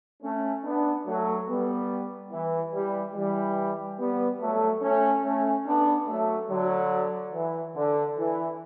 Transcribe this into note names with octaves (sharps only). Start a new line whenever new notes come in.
A3 C#4
B3 D4
F#3 A3
G3 B3
E3
E3 G3
E3 G3
G3 B3
F#3 A3
A3 C#4
A3 C#4
B3 D4
F#3 A3
D3 F#3
E3
D3
E3